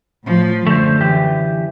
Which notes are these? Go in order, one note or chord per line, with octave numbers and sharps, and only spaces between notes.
A2 F3
F#2 D3 A3 C5
E3 G4